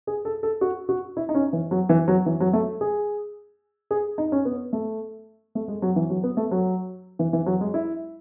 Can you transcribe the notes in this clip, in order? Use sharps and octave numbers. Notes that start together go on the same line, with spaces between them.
G#4
A4
A4
F#4
F#4
E4
D#4
C#4
E3
F#3
E3
F#3
E3
F#3
A3
G#4
G#4
D#4
C#4
B3
A3
A3
G#3
F#3
E3
F#3
B3
A3
F#3
E3
E3
F#3
G#3
E4